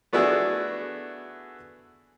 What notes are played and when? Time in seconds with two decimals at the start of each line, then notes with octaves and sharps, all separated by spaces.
0.13 A3 B3 D4 E4 F#4 G#4